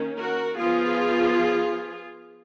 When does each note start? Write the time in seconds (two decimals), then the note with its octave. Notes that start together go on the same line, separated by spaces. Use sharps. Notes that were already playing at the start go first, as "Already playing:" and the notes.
Already playing: D#3 A#3 C#4
0.19 F#4 A#4
0.58 F3 B3 F4 G#4